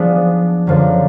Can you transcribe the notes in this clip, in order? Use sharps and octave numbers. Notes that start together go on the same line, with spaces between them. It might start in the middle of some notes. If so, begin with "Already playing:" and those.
Already playing: F3 B3 D4 G#4
F#2 D3 F3